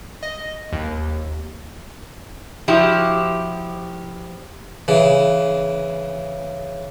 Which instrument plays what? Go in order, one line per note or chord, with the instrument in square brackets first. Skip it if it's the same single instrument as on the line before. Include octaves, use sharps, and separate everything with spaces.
[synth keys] D#5
D#2
[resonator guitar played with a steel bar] F3 E4 F#4 G4
[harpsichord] C#3 E3